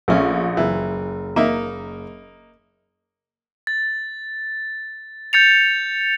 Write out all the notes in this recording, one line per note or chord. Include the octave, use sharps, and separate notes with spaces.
A#1 A3 C#4
F#1 E3
A#3 D#4 E5
A6
G6 A6 C#7 F7